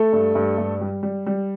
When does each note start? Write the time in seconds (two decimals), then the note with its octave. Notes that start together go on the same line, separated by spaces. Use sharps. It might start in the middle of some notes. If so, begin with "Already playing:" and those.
Already playing: A3 A4
0.13 G2
0.35 G2
0.58 G2
0.81 G3
1.03 G3
1.26 G3